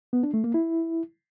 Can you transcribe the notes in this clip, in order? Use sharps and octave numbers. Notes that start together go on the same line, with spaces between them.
B3
D4
A3
A#3
E4